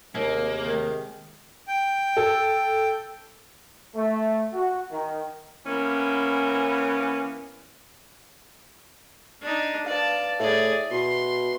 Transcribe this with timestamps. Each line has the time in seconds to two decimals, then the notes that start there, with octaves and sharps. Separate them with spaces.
0.15 D#2 C3 G#3 A#3
0.63 D#3
1.68 G5
2.17 A4
3.95 A3
4.53 F#4
4.91 D#3
5.65 E3 A#3 B3 C#4
9.41 D4 D#4
9.86 B4 D5 F5 A5
10.40 A2 G#4 D5 E5
10.91 B2 C6